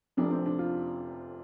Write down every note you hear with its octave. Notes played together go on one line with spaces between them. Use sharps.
F1 F2 C3 F3 D4
C4
D4
F4